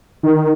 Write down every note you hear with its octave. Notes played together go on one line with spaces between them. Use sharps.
D#3